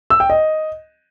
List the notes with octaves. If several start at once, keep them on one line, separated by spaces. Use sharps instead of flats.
E6
G5
D#5